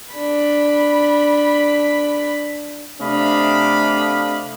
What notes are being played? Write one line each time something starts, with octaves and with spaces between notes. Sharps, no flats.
D4 B5
C3 A3 D4 D#5 F5 B5